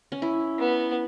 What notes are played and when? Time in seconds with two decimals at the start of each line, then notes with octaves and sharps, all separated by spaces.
0.12 C#4
0.22 E4
0.59 B3